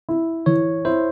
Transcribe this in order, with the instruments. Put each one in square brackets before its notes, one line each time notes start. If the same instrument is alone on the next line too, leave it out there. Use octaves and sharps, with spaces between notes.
[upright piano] E4
[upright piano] E3 [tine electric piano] C#5
[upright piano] E4 [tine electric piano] C5